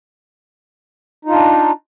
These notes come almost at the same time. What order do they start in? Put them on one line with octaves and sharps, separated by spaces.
D#4 F4 D4